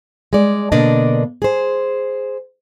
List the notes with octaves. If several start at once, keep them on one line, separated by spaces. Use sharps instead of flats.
G#3 D5
B2 D3 A#3 D4 D5 D#5
G#4 C5